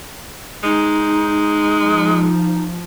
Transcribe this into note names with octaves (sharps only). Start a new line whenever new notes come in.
G#3 D#4
F3